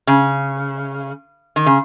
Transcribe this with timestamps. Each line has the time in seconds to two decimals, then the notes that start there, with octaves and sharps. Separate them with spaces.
0.07 C#3
1.56 D#3
1.66 C#3